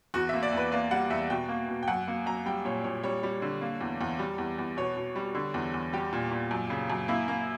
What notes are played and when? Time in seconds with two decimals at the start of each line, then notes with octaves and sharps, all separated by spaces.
0.14 E2 F#4
0.29 A#3 E5
0.43 D5
0.53 E2 B4
0.72 A#3 D5
0.91 G3 F#5
1.10 E2 E5
1.30 B2 G5
1.49 A#3
1.68 B2
1.83 G5
1.88 F#2 F#5
2.08 A#3
2.26 F#2 A#5
2.46 G3 G5
2.65 A#2 C#5
2.84 A#2 C#5
3.04 G3 C#5
3.23 G3
3.42 D3
3.61 A#3
3.81 E2
4.01 E2
4.19 G3
4.38 E2
4.58 E2
4.77 B2 C#5
4.97 B2
5.16 G3
5.35 D3
5.54 E2
5.74 E2
5.93 G3 G4
6.13 A#2
6.31 A#2
6.51 F#2
6.70 C#3
6.90 F#2
7.08 A#3 E4
7.28 A#3